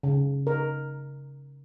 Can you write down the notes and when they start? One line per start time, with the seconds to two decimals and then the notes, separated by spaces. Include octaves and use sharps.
0.03 C#3
0.47 A#4